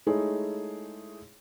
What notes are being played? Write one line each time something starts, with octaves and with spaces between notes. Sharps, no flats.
G#3 A3 D#4 E4 G#4 C#5